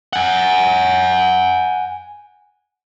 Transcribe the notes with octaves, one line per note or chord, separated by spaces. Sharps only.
F#5 G#5